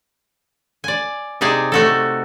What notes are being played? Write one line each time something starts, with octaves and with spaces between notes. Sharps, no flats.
D5 G#5
C3 D#4 G#4 D5
A3 F#4 A4